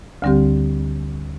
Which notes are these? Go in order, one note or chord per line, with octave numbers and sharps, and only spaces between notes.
D2 D3 G3 C4 G4